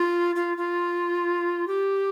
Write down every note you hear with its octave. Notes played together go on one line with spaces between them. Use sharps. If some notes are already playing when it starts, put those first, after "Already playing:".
Already playing: F4
F4
F4
G4